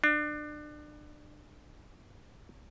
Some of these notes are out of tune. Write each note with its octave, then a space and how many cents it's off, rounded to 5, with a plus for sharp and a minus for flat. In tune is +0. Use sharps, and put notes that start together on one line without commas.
D4 +30